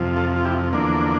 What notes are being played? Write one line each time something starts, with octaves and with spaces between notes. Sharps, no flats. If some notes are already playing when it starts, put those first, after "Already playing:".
Already playing: F2 C3 F3
F4 A4
F4
E4 G4
E2 D3 F3 A#3 D4